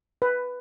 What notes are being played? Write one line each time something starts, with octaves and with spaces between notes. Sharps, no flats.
B4